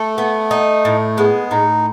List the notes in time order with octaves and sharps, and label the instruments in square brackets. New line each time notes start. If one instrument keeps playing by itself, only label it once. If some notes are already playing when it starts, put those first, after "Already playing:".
Already playing: [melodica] A3 [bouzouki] A4
[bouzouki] B3
D#4
A2
[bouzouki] G#3 [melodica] B3
[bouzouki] A2 [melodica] D#4